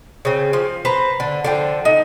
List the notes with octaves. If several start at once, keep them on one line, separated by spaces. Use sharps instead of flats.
C#3 C4
F3
B4 C5 A#5
D3
D3 F3 G5
D#4